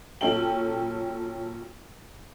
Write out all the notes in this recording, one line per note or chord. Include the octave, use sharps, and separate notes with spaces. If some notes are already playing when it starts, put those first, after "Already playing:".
A#2 F#3 C#4 A4 G5 F#7